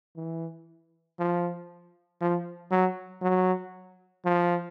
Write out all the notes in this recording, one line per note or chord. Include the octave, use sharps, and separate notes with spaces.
E3
F3
F3
F#3
F#3
F3